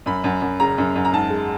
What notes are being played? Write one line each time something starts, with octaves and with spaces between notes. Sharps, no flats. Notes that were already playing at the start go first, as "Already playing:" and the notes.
F#2 B5
F#2
F#2
C#3 A#5
F#2
F#2
A#5
G#2 A5
G#3